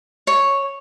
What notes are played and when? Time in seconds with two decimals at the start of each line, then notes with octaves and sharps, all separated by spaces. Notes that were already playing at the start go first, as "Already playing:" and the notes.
0.27 C#5